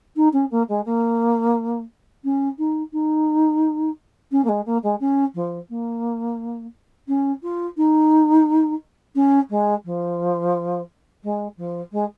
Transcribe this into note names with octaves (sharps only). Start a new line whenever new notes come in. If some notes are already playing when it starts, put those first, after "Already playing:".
D#4
C#4
A#3
G#3
A#3
C#4
D#4
D#4
C#4
A#3
G#3
A#3
G#3
C#4
F3
A#3
C#4
F4
D#4
C#4
G#3
F3
G#3
F3
G#3